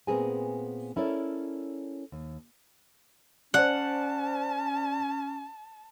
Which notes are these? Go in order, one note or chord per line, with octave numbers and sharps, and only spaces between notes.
A#2 B3 C4 G#4 A#4 G#5
C#4 E4 A4 A#4 C#5 D5
D#2
C#4 C5 D5 F#5 A5